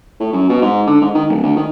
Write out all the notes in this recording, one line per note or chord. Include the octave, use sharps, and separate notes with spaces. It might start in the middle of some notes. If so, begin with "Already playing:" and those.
A2
F#2
B2
G#2
D3
G#2
D#3
D1
D2
D#3